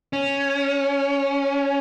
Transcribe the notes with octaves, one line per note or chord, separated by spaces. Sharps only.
C#4